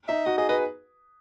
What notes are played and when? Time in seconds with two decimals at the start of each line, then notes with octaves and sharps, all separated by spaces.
0.08 D#4 E5
0.25 F#4 D#5
0.38 G#4 D#5
0.49 B4 D#5